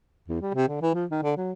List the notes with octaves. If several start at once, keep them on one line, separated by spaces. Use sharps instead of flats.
E2
G3
C3
D3
E3
F3
D#3
D3
F#3